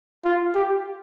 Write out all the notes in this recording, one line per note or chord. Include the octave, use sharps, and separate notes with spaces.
F4
G4